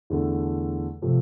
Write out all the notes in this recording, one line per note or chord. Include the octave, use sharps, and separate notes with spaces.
E2 D3 A3
C3 F3 A3